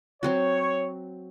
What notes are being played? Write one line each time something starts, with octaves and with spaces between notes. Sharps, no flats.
F#3 C4 F#4 C#5